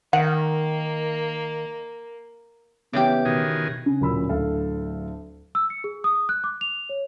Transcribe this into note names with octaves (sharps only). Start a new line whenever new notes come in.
D#3 A#3 F#5
C#3 E3 B3 G4 D6
B2 D#3 G#4
C#3
D1 A#2 C#4 B5 E6
D1 D2 A4 F5
E6
C#7
G#4
D#6
F#6
D6
F7
C#5